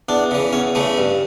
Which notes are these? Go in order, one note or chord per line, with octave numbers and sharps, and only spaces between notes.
E2 D4
C#3 E3
E2 C#4
C#3 E3 A3
G2